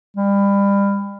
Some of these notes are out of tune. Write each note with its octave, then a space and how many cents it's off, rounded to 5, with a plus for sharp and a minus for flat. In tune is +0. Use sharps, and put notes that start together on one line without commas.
G3 +30